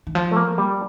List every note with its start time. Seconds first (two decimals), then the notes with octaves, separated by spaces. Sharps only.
0.07 D#3
0.15 F3
0.31 A3
0.36 A#3
0.58 G3